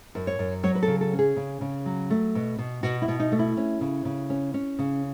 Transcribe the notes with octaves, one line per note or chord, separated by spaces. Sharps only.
F#2
C#5
F#2
F#3 C#5
B4
C#3 A4
A4
C#4
G#4
C#3
C#3
F#3
A3
B2
B2
B2 F#4
E4
B2
D#4
A3
E4
C#4
C#3
C#3
C#4
C#4
C#3